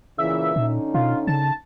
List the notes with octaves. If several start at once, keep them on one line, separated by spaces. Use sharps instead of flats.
A#2 C#3 E3 E5
A#2 D3 C#4 D#4
B2 F4
C#3 A5